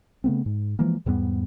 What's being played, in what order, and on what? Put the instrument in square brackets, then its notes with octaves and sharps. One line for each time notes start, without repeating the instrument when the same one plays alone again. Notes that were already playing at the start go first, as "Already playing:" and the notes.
[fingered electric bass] C#3 A3 B3 C4
G#2
E3 F3 G#3 A#3
E2 G#2 G3 B3